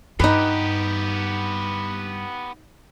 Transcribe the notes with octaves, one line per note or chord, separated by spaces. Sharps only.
G2 B3 D#4 G4 B4